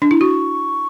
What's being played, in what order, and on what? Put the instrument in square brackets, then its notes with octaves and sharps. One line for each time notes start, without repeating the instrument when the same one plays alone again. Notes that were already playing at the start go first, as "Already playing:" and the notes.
[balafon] D4
E4
[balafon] F#4 [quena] C#6